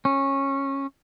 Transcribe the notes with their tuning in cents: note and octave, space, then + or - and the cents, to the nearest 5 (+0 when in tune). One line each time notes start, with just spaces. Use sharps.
C#4 -15